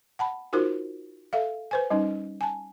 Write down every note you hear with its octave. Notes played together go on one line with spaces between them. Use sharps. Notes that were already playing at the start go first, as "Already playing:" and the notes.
F#5 A5 B5
D#4 F4 F#4 A#4 C5
A4 E5 F5
B4 C5 G#5
G3 C#4 D#4
G#5 A5